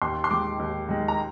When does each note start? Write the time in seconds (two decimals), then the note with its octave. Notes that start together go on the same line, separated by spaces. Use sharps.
0.02 D#2 C6
0.24 C6
0.31 D#3 G#3 D6
0.59 D#2
0.88 D#3 G#3
1.08 A#5